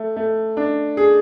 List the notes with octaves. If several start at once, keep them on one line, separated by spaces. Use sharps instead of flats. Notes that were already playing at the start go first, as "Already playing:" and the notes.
Already playing: A3
A3
D4
G#4